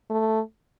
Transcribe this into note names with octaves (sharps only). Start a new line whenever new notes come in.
A3